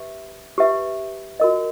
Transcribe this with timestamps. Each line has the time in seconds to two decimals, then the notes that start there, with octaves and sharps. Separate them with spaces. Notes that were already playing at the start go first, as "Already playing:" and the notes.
Already playing: G4 B4 E5
0.58 G4 B4 E5
1.40 F#4 A#4 D#5